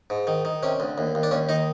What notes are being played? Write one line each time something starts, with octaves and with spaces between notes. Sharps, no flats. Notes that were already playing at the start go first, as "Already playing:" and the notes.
G#2
D#3
D#3
C3 C#4
D2
D#2
D#2
D4
D#2 C#4
D#3 D#4